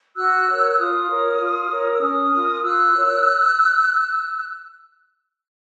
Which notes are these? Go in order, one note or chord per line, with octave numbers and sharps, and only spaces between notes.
F#4 E6 F#6
A#4 C#5
F4 D#6 F6
A#4 C#5
F4
A#4 C#5
E6
C#4 D#6 F6
F4 A#4
F4 E6 F#6
A#4 C#5